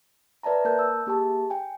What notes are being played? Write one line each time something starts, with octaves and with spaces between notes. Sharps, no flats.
B4 D5 E5 A5 A#5
A#3 A#4 A5 F#6 G6
E6
A#3 G4 G#4 A5
G5 G#5